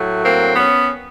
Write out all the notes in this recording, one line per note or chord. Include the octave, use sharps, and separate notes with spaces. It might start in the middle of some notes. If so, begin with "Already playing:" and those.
Already playing: A2 F#3 A3
A#3 C4
B3 C#4